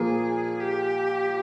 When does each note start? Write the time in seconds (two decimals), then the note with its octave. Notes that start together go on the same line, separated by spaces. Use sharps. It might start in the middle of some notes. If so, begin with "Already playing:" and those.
Already playing: A#2 F3 A#3 G#4
0.60 G4